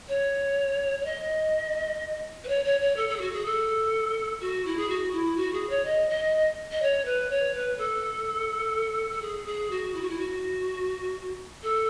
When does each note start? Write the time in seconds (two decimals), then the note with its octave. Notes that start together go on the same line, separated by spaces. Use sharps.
0.08 C#5
1.00 C#5
1.05 D#5
2.44 B4
2.48 C#5
2.64 C#5
2.81 C#5
2.96 A4
3.09 A4
3.16 G#4
3.21 F#4
3.33 G#4
3.45 A4
4.41 F#4
4.66 E4
4.77 G#4
4.89 F#4
5.13 E4
5.37 F#4
5.53 G#4
5.69 C#5
5.85 D#5
6.09 D#5
6.71 D#5
6.82 C#5
7.05 B4
7.30 C#5
7.54 B4
7.78 A4
9.11 A4
9.21 G#4
9.46 G#4
9.71 F#4
9.95 E4
10.01 F#4
10.09 E4
10.19 F#4
11.63 A4